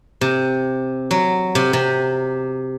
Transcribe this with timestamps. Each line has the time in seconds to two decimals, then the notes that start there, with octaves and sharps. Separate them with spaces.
0.21 C3
1.11 F#3
1.55 C3
1.73 C3